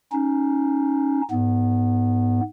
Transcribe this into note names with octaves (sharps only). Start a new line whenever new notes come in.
C#4 D#4
G#2 B3